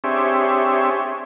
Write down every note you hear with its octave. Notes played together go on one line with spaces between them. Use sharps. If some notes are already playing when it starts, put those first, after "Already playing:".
C4 D4 G4 G#4 C#5 E5